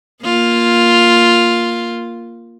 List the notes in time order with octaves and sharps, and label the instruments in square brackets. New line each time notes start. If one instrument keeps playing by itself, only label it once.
[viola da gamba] A#3 F4